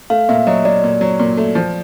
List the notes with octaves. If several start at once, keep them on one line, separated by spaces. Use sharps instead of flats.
A3 F5
A#2 E5
F#3 D#5
F#3 D5
A#2
F#3
A#2
A3
F3